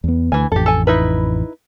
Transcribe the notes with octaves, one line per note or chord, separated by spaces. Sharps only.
E2 B3
D2 E3 G#5
A1 F2 G4 A4
A4 G#5
D#4 E4 B4